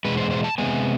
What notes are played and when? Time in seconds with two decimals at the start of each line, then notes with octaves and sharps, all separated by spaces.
0.05 E2 B2 G#3 B4
0.17 C5
0.31 C5
0.44 A5
0.58 C3 G#3 B3 G#5